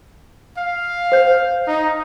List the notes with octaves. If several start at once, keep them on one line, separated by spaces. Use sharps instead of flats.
F5
C5 G6
D#4